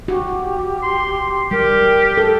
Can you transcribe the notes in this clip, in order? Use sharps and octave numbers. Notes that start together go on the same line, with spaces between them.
F#4 G4
C6
G3 G4 A#4
A4